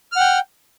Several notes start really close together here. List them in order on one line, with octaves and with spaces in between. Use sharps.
F6 F#5 G5